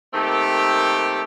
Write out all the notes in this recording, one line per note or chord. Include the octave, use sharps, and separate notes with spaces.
D#3 A3 A#3 C4 G4